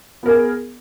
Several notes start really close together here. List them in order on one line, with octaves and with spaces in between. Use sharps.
B3 A#4 G#4